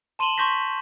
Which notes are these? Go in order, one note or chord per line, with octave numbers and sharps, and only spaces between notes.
A5 C6 D#7 E7 F#7 G7
C6 C#6 G6 A#6 B6